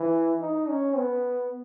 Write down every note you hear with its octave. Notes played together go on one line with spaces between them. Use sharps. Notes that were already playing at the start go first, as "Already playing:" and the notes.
Already playing: E3
D#4
C#4
B3